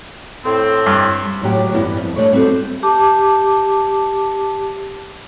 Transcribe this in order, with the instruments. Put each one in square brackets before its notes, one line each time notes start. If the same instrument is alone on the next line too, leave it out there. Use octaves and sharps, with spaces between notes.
[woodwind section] A2 C4
[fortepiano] G2
[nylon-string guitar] D2 A2 F#3 G#3 G4
E2 G2 B3 E4
F2
G#3 A3 D4 G4 C#5
G3 C4 E4 F#4 A4
[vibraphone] G4 A5 D6